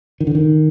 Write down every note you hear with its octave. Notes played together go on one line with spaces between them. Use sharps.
D#3
D3
D#3